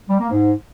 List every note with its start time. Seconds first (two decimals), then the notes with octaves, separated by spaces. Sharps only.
0.10 G3
0.20 A#3
0.31 G#2